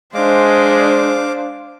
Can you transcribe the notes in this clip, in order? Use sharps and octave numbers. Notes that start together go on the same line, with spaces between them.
G#3 D4 C5 F5 D6